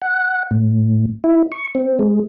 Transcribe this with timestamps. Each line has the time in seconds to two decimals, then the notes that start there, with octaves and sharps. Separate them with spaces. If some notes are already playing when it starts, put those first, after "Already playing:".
0.02 F#5
0.51 A2
1.24 E4
1.52 C#6
1.75 C4
1.99 G#3